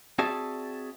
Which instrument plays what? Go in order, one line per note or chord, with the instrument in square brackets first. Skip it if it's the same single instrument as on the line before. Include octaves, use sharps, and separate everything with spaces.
[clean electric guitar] C4 F#4 G#4 D5 E5 A5